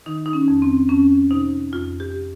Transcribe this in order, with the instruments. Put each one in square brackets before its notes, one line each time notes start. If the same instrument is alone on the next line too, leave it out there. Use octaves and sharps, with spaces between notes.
[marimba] D#3 D#4
D#4
C#4
F2
C4
F2 C#4
C3 D#4
F2 F4
G4